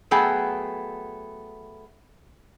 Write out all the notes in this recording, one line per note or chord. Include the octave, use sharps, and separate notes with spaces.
F#3 A3 B3 G#4 G5